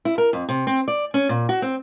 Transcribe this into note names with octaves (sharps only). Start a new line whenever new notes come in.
E4
A#4
F2
C3
C4
D5
C#4
A#2
F#4
C4